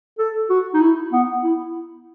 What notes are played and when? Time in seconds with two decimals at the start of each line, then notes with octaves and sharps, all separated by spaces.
0.19 A4
0.50 F#4
0.74 D#4
0.81 E4
1.13 B3
1.44 E4